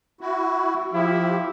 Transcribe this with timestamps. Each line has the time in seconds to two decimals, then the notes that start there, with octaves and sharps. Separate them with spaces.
0.21 E4 F#4
0.93 F3 E4 G4